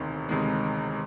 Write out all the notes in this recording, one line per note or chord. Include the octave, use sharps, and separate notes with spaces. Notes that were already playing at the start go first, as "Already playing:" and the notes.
Already playing: E1 D2 C3 D#3
E1 D2 C3 D#3 G#3